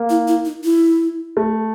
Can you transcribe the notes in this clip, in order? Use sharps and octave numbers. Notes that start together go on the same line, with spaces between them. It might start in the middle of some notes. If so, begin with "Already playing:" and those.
Already playing: A#3
E4
E4
D#4
E4
A3